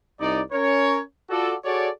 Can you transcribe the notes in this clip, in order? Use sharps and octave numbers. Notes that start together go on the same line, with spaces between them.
C2 D#4 D5
C#4 A#4 C#5
F4 F#4 A4 D5
F#4 G#4 A4 C#5 D5